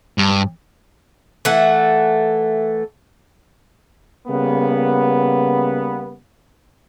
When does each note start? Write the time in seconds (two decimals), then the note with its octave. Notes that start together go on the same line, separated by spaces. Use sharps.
0.18 G2
1.45 E3 A3 F#5
4.28 C#3 G3 A#3 B3